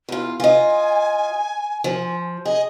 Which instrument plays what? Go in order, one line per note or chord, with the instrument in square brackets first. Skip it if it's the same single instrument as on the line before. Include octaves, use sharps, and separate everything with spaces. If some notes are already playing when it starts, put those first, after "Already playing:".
[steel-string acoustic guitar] E2 F4
[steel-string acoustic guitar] F4 D#5 [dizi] G#5
[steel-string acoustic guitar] F3
[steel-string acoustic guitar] G#4 [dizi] D#5